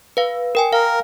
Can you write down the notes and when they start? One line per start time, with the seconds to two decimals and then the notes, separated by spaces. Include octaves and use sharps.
0.17 B4 F5
0.55 A#4 G5 G#5
0.73 A#4 F5